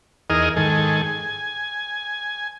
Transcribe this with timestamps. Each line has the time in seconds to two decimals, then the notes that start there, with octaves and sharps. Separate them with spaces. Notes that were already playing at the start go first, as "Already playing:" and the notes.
0.30 E2 D#4 G#4 A#4 D#5 F6
0.56 G#2 D#3 A4 G#5
1.04 G#5